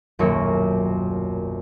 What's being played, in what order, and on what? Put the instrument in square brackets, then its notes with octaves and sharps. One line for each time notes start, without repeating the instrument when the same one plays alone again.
[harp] D#1 B1 F#2 F#3 A#3 C#6